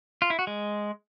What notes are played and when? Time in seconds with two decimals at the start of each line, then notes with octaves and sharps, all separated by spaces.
0.22 F4
0.30 E4
0.39 F#4
0.47 G#3